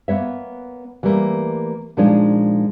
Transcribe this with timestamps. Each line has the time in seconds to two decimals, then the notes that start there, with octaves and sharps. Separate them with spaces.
0.08 A#3 B3 C#5 E5
1.03 E3 G3 A3 A#3
1.97 A#2 F3 G#3 D4 D#4 C#5